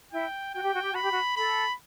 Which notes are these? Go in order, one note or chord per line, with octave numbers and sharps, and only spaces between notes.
E4 G5
F#4 G5
G4
F#4
G4
F#4 B5
G4
F#4
A4 B5